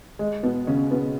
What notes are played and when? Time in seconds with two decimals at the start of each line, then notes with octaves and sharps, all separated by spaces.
0.19 G#3
0.43 B2 B3
0.67 C#3 C#4
0.91 B2 B3